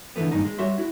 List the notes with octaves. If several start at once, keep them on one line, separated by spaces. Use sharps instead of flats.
D3 E3 G3 A3 B3
G2 A#2 D#3 D#4
G#3
G3 F#4 C#5 E5 C6
E4 F#4